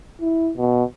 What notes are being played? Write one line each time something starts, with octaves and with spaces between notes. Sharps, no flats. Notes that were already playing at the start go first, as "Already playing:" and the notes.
E4
B2